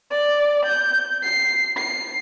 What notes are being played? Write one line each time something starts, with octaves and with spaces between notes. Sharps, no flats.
D5
G6
C7
C7